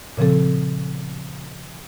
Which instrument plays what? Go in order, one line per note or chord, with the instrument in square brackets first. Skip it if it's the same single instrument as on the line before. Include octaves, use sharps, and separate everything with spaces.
[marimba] A#2 C#3 F3 C4 A4